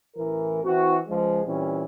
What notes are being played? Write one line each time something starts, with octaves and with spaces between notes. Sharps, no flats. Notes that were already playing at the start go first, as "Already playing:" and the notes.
A1 E3 A#4
E3 C4 E4 F#4
C#2 F3 G#3
A#2 E3 G3 C4 C#4